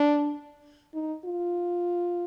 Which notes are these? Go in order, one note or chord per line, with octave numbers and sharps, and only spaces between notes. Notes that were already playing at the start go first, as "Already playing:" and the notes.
Already playing: D4
D#4
F4